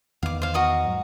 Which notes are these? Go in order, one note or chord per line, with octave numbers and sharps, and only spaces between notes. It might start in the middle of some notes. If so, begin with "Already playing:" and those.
E2 D#3 B3 F5 D6
C5 F5
F#4 D#5 A#5
G#2 F#3